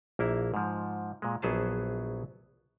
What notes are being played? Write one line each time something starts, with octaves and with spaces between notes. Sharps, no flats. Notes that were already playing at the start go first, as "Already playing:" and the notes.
A#1 A#3 E4
G#2 F3
A#2 G#3
A#1 F#3 B3 G#4 C5 A5